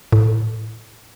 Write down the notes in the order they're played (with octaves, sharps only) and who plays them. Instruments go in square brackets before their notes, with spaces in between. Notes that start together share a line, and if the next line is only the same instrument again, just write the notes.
[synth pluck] A2